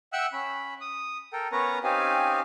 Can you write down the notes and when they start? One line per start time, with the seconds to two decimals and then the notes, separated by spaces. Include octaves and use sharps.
0.13 E5 F#5 G5 E6 F#6
0.33 C#4 B5
0.81 D#6
1.33 A4 A#4 G5
1.52 B3 C#4 A#4 B4 C#5 A#5
1.83 C4 C#4 D#4 G4 F5 G#5